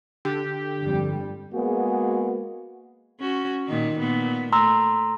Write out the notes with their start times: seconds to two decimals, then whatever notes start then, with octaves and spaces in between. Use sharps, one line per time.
0.25 D3 G4
0.79 G1 F2 G3
1.54 G#3 A#3 B3 F#4 G#4
3.20 C#4 F#4
3.67 A#2 D#3 D#4
3.99 A#2 B3
4.52 A3 A#5 C6 E6